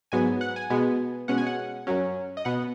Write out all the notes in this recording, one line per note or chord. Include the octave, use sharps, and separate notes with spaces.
G#2 F#3 B3 G#5
F#5
G#5
B2 G#3 B3
B2 G#3 C#4 F#5
G#5
F#5
F#2 F#3 C#4
D#5
B2 B3 F#5